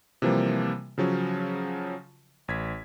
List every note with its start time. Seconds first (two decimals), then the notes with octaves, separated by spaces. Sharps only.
0.22 C3 E3 F3 G3 A#3
0.98 C#3 F3 F#3 C#4
2.48 A1 G#6 B6